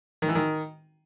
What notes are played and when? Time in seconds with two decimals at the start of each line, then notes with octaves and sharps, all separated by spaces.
0.22 D#3
0.29 E3
0.35 D#3